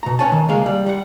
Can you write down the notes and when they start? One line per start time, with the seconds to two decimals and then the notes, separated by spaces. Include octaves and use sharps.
0.03 B2 A#5
0.19 C#4 B4 C#5 G#5 A5
0.32 D#3
0.48 C2 C#3 G#3 A#3 G#4 F5
0.66 G3
0.86 G3 F#5